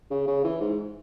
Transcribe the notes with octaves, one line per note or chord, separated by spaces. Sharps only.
C#3
C#3
E3
G#2